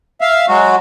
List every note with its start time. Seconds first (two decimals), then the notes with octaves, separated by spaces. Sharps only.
0.21 E5 F5
0.48 F#3 G#3 F#4